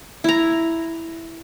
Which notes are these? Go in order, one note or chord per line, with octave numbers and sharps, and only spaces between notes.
E4 A#5